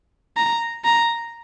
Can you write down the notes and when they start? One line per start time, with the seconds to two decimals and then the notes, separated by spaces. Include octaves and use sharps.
0.37 A#5
0.84 A#5